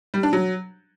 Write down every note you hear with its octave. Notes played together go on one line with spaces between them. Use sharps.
G3
D4
F#3